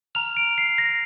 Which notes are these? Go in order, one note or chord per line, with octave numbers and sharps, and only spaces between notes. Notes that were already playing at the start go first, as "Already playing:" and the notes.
A#5 F6 F7
D7
C7
A#6